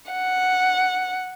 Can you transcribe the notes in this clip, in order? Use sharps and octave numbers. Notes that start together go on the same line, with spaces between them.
F#5